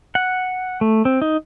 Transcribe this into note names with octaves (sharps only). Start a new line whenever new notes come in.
F#5
A3
C4
D#4